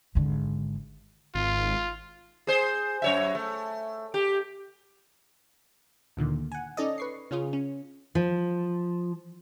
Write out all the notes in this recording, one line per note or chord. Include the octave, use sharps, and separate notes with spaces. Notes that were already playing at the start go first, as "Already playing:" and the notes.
G#1 D3
G#1 F4
G#4 C5
F#2 C#5 E5
A3
G4
D2 A#2 D3 D#3
F#5 G#5
C#4 D#4 A4 D5 D#5
B4 C#6 C7
C#3 C#4 F4 G#4
C#4
F3